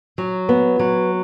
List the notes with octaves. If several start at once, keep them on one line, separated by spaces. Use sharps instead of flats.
F#3
B3
F#3